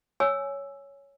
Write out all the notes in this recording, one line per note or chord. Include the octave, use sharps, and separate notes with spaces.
C#5 G#5 E6